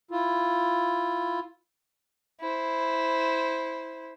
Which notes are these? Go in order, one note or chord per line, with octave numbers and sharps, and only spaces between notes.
E4 F4
E4 C5